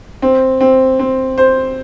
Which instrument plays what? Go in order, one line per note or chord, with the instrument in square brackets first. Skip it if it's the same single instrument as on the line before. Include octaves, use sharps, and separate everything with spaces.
[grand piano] C4
C4
C4
C5